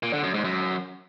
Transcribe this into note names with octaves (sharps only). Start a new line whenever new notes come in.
A#2
D3
F#2
G#2
F#2